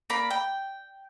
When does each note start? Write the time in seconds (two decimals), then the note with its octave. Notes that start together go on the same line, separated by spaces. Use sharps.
0.10 A#3 D5 B5
0.30 G5